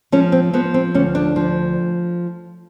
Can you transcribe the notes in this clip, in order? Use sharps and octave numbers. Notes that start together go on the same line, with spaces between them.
F3 C#4
C4
F3 B3
C4
D2 C#4
D4
F3